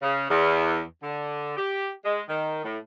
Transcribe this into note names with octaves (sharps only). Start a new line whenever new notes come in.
C#3
E2
D3
G4
G#3
D#3
A2